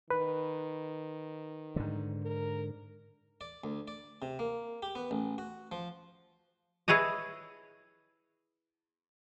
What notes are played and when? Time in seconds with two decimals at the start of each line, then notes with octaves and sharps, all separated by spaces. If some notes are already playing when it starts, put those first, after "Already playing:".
0.10 D#3 B4
1.76 G#2 D3
2.23 A#4
3.41 D5
3.64 D2
3.88 D5
4.22 C3
4.39 A#3
4.82 G4
4.95 B3
5.11 A1
5.38 F#4
5.72 F3
6.88 E4 G#4 B4 C#5 D#5